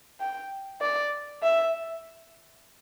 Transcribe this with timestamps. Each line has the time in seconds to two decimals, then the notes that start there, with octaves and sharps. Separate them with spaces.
0.20 G5
0.82 D5
1.43 E5